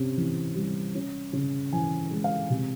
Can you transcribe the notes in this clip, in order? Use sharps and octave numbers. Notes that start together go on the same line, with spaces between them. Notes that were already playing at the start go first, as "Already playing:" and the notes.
Already playing: C3 C#4
E3
G3
C#4
C#3
E3 G#5
G#3
F5
C3